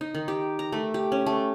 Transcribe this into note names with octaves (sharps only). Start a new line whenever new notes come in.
D#4
D#3
G4
A#5
A3
G4
C#4
A3